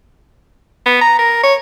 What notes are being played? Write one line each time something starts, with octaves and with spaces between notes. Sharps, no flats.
B3
A#5
A#4
C#5